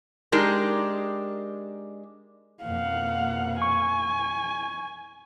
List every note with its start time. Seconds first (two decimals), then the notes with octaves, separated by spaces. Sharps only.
0.32 G#3 D4 D#4 G4 A#4
2.63 F2 B2 A#3 F5 F#5
3.62 G#5 C#6